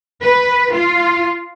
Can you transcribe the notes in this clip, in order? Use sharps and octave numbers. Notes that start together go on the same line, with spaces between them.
B4
F4